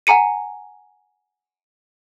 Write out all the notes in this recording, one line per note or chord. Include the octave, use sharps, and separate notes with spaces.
F#5 G#5 A#5 C#7 D#7